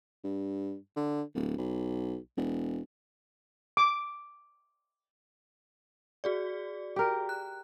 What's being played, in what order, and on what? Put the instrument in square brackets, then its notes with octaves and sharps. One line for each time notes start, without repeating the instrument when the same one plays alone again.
[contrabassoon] G2
D3
D1
B1
E1
[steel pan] D6
[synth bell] F#4 G#4 D5
[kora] G4 A#4
[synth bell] F#6